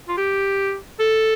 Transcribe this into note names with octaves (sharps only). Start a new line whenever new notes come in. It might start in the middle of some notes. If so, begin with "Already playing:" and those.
F4
G4
A4